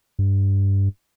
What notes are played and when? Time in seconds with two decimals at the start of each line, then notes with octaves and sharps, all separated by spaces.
0.19 G2